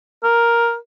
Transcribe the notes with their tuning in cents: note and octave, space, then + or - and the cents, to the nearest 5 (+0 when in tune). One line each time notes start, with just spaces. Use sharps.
A#4 +5